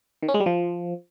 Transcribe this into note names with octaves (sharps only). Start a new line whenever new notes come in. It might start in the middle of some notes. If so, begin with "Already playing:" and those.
D#3
C#4
G#3
G3
F3